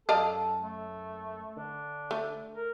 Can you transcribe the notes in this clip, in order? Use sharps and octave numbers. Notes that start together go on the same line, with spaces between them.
F#2 A4 D5 D#5 F5 A5
A3
D3 D4
A3
A#4